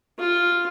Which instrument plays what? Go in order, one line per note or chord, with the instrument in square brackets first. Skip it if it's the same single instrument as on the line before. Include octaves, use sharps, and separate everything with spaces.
[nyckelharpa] F4